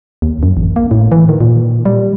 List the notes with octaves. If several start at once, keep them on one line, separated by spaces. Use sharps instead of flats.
D#2
F#2
A1
A#3
A2
E3
D#3
A#2
G3